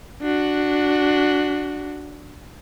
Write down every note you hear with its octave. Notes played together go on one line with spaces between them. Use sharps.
D4 F#4